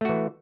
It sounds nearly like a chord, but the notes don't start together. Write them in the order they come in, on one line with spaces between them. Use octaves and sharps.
A3 F#4 E3